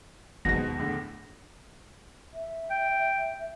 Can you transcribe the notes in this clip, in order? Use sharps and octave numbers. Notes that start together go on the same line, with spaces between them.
D#2 G#2 B2 D#3 A#6
E2 A2 D3
E5
G5